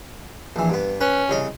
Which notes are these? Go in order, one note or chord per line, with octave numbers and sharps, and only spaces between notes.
A#1 E3
G2 B3
C#4 B4
C2 C#3 D#5